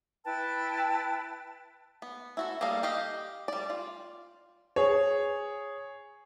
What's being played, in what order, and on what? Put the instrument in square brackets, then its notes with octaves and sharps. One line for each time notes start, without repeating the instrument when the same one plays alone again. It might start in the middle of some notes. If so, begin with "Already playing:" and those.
[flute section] E4 B4 G5 A5
[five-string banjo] B3
E4 F#4 A4
G3 A#3 A4 D#5 F5
G4 D#5 F5
G3 D5
F4
[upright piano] G#4 C#5